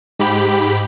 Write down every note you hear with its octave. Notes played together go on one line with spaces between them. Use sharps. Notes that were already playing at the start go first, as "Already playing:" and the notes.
G#2 G4 B5